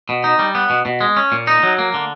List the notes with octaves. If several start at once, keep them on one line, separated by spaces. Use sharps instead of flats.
B2
D#4
G3
B3
B2
B2
G#3
C#4
A#2
D#4
F#3
A#3
D3